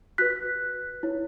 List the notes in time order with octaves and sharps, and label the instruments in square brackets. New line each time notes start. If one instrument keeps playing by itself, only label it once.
[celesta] F#4 B4 F#6 B6
E4 C#5